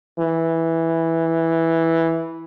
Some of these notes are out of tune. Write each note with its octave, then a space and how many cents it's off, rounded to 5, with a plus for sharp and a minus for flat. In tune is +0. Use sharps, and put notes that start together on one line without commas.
E3 -5